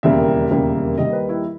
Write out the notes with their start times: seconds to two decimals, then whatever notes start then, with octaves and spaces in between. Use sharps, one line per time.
0.03 E1 D#2 C#3 G3 A#3 E5
0.50 E1 D#2 C#3 G3 A#3
0.97 D#2 D#3 G3 A#3 D#5
1.13 B4
1.29 E4